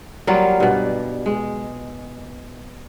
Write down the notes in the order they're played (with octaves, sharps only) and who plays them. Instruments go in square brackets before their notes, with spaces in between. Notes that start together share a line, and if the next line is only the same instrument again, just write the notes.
[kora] F#3 G3 A#3 F4
G2 B2
G#3